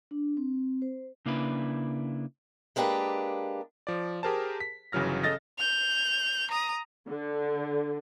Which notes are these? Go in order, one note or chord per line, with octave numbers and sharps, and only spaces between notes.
D4
C4
C5
C#3 A#3 D4 E4 B4
G#3 A#3 D4 G4 B4
F3 D5
G4 G#4 A#4 C5 A5
B6
G1 C#3 E3 F#3 F6 A#6
C#3 A4 D#5 A6 A#6
G6 F7
A#5 D#6
D3